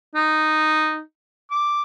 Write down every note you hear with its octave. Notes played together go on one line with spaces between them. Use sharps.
D#4
D6